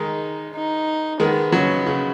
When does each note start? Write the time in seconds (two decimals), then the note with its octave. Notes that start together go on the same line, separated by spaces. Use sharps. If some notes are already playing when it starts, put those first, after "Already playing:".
Already playing: D#3 G#3 D#4
0.53 D#4
1.20 D#3 G#3 B3
1.52 C#3 F#3
1.86 C#3